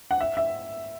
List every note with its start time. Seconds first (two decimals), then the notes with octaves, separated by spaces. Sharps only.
0.11 F#5
0.21 E5
0.37 E5